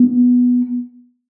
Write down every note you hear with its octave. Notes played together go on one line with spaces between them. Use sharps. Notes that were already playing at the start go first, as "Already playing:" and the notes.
Already playing: B3